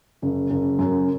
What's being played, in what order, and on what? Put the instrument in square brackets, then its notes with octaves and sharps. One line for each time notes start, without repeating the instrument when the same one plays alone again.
[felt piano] F#1
F#1
F#2